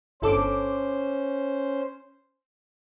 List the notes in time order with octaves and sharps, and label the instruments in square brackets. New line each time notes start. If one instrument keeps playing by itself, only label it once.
[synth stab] G1 A4 D6 [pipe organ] C#4 C5